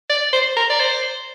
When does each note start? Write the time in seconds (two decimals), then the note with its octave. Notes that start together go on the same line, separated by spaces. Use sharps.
0.10 D5
0.33 C5
0.57 A#4
0.70 D5
0.80 C5